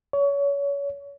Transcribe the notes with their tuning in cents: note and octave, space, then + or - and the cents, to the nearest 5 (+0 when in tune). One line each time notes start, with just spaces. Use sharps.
C#5 +30